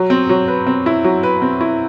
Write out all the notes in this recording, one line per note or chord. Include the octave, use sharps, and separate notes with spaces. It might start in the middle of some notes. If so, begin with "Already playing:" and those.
Already playing: F#3
C4
F#3
B4
C4
E4
F#3
B4
C4
E4